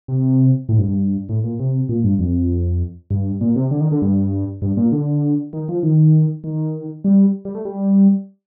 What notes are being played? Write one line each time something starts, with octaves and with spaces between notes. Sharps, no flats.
C3
A2
G2
G2
A2
A#2
C3
A#2
G2
F2
G2
A#2
C3
D3
D#3
D3
G2
G2
A#2
D3
D#3
F3
D#3
D#3
G3
G3
A3
G3